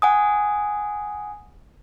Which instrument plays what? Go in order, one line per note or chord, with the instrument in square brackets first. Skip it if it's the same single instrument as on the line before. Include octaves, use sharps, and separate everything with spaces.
[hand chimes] F#5 G#5 D#6